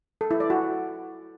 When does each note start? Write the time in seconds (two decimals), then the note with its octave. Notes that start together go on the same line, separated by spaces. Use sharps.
0.21 A4
0.31 E4
0.40 D5
0.50 F#4